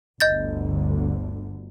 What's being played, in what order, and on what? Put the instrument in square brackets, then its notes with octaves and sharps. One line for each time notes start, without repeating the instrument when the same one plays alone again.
[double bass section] G1 D2 D3 [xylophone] D#5 G6 A6